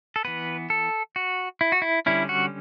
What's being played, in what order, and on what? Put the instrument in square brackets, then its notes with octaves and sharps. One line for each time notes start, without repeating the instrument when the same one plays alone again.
[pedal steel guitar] A4
E3 B3 B4
A4
F#4
E4
F#4
E4
D3 G3 C#4 E4
F#4